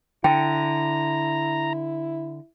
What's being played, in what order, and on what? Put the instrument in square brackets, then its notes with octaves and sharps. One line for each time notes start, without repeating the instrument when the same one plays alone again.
[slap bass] D3 [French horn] E4 [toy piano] G5 [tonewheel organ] A#5